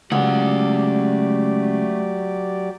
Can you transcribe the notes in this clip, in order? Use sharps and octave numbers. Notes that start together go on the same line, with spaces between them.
C#2 F#3 A3 G4 D5 F#5